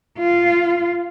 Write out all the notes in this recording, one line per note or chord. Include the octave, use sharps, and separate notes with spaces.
F4